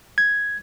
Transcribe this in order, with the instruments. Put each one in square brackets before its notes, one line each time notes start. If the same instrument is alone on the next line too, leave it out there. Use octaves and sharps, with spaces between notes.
[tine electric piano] G#6